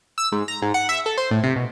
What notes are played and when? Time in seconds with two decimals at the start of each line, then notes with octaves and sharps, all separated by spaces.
0.18 E6
0.32 G#2
0.48 A#5
0.62 G#2
0.74 F#5
0.89 E5
1.06 A4
1.17 C5
1.31 A2
1.43 C3
1.56 B2